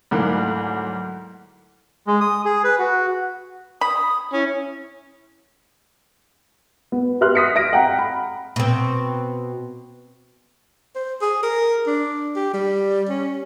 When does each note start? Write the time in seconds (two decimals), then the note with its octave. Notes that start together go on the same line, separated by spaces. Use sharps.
0.11 D2 G#2 F#3 A3 A#3 E4 A4
2.07 G#3
2.21 D#6
2.45 G#4
2.64 B4
2.79 F#4
3.81 B5 D#6
4.33 C#4 E4
6.92 B3
7.21 G4 B4 E5 C6 F6 F#6
7.35 D#6 B6 C#7
7.55 E5 A#6 D7
7.73 F#5 G5 A#5
7.99 B5
8.56 B2 C4
10.95 C5
11.21 G#4
11.43 A#4
11.87 D4
12.36 G4
12.53 G3
13.09 C#4